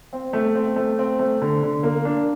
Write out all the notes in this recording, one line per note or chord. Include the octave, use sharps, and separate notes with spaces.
C4
A3
C4
A3
C4
A3
D3
D3
A#3
D4